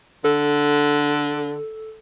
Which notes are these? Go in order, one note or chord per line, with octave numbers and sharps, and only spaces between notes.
D3 A4